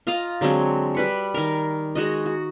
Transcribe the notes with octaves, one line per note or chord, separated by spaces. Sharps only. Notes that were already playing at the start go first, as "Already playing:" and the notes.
F4 D#5 F5 A#5
D3 F#3 G#3 C4
G3 B4 C#6
D#3 A#4
G#3 F#4 D#5
F#4